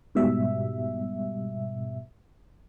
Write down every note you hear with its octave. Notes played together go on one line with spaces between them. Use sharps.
G#2 B2 G3 E5